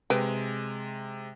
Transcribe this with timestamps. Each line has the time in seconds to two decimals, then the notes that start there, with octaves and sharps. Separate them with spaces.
0.10 C3 G#3 B4 G5